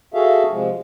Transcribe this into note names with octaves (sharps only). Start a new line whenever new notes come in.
F#4 G#4 A4 E5 F5
C3 F3 G#3